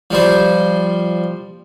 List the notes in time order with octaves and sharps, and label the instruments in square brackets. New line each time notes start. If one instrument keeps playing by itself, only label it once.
[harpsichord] F3 G3 C5